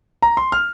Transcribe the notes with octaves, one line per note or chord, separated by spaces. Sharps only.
A#5
C6
F6